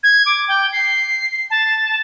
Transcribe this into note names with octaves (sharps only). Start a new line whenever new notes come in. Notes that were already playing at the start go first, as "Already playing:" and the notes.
G#6
D6
G5
C7
A5